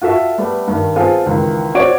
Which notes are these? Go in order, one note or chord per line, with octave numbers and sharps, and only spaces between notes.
F4 F#4 A4 E5 C#6
G3 A3 B3
G2 D#3
B3 C4 F4 G#4 A4
C#2 D#3 E3
C4 F#4 C#5 D5 D7